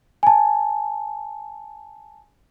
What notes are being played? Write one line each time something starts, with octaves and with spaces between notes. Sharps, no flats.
G#5 A5